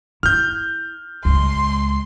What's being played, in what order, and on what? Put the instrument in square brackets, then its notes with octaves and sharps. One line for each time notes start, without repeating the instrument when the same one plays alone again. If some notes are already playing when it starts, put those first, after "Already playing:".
[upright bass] E4 [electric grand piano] F6 G6
[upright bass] C#2 G#3 [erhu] C6